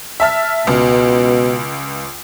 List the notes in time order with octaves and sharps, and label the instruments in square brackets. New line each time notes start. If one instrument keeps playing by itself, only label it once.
[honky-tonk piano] E5 A5 F6
[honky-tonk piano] C#2 [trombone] B2